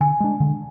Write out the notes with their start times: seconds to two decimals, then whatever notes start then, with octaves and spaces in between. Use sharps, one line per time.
0.01 D3 G#5
0.20 G#3 D4
0.40 D3